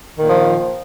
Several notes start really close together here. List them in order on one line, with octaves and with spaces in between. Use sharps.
D#3 A#2 F3